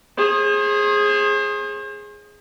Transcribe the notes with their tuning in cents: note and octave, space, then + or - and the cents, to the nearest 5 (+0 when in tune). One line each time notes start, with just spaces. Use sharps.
G#4 +0 C5 +40